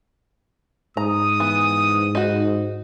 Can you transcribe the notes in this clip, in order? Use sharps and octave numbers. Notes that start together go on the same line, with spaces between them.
G#2 A#5 D#6
E3 B3
D#4 F#4